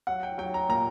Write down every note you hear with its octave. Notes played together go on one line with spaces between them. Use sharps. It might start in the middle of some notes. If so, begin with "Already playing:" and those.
F#3 F#5
G5
F#3 G5
A#5
A#2 A#5